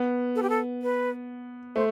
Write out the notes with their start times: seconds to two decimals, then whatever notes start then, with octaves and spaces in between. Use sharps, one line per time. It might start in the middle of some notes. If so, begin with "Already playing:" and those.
Already playing: B3
0.36 A4
0.43 G4
0.50 A4
0.82 B4
1.76 A3 C5